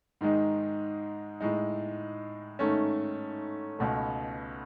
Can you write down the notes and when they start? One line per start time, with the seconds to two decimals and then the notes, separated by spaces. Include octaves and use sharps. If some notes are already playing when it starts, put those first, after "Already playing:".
0.21 G#2 D#3 G#3 D#4
1.40 A2 G#3 D#4
2.59 G#2 D#3 A3 C#4
3.79 C#2 B2 A3